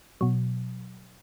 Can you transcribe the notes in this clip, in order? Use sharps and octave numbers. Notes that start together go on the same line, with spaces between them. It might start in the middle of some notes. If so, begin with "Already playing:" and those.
B2 F#3